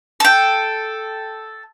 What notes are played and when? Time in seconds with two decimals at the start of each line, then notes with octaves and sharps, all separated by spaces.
0.20 A4 G5